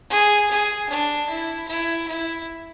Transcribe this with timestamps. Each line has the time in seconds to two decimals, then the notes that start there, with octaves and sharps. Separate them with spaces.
0.10 G#4
0.50 G#4
0.89 D4
1.29 E4
1.68 E4
2.07 E4